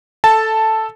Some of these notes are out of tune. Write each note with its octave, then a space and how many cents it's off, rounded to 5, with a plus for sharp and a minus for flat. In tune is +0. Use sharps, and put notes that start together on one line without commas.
A4 +0 A5 +0